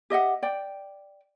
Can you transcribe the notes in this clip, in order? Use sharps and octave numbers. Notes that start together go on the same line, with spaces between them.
G4 D#5 E5 F#5
D5 G5